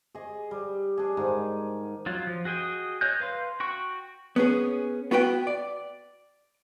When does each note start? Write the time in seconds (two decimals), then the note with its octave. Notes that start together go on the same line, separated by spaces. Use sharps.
0.15 G#4 D#5
0.51 G3
0.97 D4 G#4
1.17 G#2 D#3
2.06 F#3 F4
2.27 F3
2.45 F#4 G#4 D#5 G5
3.01 C#5 D#5 G#5 F#6 G6
3.20 B4 F5 C6
3.60 F#4 G5 C#6
4.36 B3 C#4 G#4
5.11 B3 F#4 B4 G5
5.47 D5